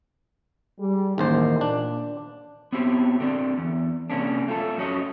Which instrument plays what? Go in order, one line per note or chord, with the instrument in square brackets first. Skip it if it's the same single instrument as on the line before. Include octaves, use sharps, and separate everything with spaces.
[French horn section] G3 G#4
[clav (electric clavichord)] A1 D#2 C5 [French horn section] D#3
[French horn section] A#2 [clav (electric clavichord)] D4
[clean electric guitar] B3 C4 E4 G4 C#5
D3 C4 D5
E2
C3 A#3 C#4 D4
A3 F4 A4
F#2 C#4 F#4 C#5 D#5